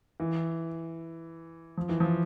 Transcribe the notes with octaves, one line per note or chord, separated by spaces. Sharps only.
E3
F3
E3
F3